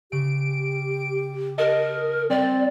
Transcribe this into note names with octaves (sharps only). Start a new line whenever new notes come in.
C#3 G4 D7
A#4 D#5 A5
G3 C4 D5